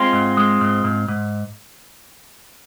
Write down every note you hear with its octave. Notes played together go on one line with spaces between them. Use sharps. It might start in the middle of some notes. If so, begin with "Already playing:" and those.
Already playing: G#3 C4 F4
G#2
G#3
G#2
G#2
G#2